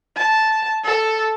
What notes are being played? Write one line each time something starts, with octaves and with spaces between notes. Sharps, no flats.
A5
A4